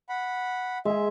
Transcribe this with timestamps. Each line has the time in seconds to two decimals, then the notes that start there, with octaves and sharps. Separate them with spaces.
0.09 F#5 B5
0.85 G#3 G#4 E5